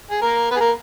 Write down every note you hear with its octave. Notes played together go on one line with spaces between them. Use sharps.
G#4
A#3 A#4
B3 B4
G#4
A#3 A#4